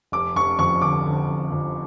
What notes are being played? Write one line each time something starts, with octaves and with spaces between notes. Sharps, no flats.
F1 D6
F1 C#6
F2 C#6
D3 D6
D3
F1
F2